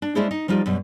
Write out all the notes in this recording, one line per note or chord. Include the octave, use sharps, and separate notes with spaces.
D4
G#3 C#4 D4 E4 G#4 C5
D#4
F3 G3 D#4 F4 G4
F#2 B2 G3